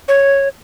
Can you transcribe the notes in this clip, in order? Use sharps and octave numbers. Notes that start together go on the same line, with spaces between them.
C#5